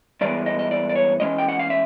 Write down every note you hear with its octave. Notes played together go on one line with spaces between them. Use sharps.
G2 E3 G#3 B3 D5
D#5
D#5
D5
D5
C#5
E3 G#3 C#4 D#5
G5
F#5
F5
E5